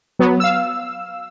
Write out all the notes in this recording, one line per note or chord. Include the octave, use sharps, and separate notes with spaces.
F#3 B3
F5 E6